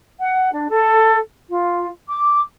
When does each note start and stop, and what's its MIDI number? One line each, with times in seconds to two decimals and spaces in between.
0.19 0.49 78
0.52 0.66 62
0.69 1.17 69
1.49 1.87 65
2.08 2.41 86